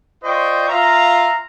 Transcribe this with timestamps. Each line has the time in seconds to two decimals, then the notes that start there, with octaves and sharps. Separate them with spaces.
0.24 F4 C5 D5 D#5 G5 C#6
0.69 F4 E5 F5 A#5